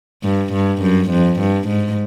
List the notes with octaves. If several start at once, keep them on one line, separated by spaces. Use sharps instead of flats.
G2
G2
F#2
F2
G2
G#2